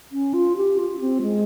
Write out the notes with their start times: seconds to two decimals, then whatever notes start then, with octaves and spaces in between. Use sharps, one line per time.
0.12 C#4
0.34 F4
0.57 G4
0.79 F4
1.00 C4
1.22 G#3